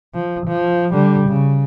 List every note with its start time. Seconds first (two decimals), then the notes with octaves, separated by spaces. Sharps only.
0.14 F3
0.47 F3
0.92 D3 G3
1.28 C#3